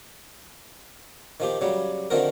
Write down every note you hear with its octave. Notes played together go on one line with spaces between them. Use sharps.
D#3 F3 G4
C#3 F#3 G3
D3 D#3 F3 C4 F#4 A#4